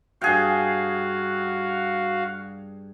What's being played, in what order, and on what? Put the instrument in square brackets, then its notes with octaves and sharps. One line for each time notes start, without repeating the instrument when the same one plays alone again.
[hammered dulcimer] G2 G#4 G5 [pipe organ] F#4 F5